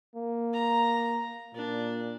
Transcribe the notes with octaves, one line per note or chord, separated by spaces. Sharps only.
A#3
A#5
A#2 D4